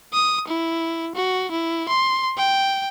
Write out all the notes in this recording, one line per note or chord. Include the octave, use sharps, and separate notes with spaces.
D#6
E4
F#4
E4
C6
G5